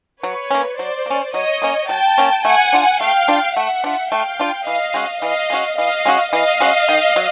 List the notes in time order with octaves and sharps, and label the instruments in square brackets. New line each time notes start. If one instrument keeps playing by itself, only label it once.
[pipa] F#3 [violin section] B4 C#5
[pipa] A#3 C#4
[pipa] F#3 [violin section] C5 D5
[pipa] A#3 C#4
[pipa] F#3 [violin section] C#5 D#5
[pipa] A#3 C#4
[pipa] F#3 [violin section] G5 A5
[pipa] A#3 C#4
[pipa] A3 [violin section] F#5 G#5
[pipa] D4 F4
[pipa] A3 [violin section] F5 G5
[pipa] D4 F4
[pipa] A3 [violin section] E5 F#5
[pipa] D4 F4
[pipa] A3 [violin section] F5 G5
[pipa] D4 F4
[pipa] E3 [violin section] D#5 F5
[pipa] G#3 C#4 F#4
[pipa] E3 [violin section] D#5 F5
[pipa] G#3 C#4 F#4
[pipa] E3 [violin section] D#5 F5
[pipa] G#3 C#4 F#4
[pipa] E3 [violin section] D#5 F5
[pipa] G#3 C#4 F#4
D#3
F#3